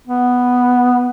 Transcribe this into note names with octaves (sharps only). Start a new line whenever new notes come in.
B3